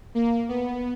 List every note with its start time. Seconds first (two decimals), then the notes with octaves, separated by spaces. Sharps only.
0.15 A#3
0.49 B3